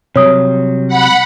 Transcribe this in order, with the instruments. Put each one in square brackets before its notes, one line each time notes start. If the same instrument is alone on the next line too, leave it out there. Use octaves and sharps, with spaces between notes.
[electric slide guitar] C3 F#3 G3 [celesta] C#5 D#6
[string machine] F#5 B5